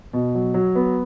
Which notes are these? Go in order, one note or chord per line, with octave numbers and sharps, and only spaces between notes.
B2
F#3
F#3
B3